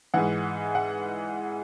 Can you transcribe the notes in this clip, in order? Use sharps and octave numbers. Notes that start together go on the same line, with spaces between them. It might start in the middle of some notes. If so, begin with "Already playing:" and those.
G#2 E3 F#5
F#5